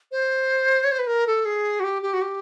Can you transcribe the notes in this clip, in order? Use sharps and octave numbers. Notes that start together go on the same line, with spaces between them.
C5
C#5
C5
B4
A#4
A4
G#4
F#4
G4
G4
F#4
G4